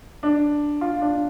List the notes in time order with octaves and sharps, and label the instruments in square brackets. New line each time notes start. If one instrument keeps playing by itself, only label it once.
[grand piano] D4
F4
D4